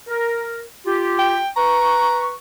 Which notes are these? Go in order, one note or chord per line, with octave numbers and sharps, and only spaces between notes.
A#4
F4 G4
G5
B4 A#5 C#6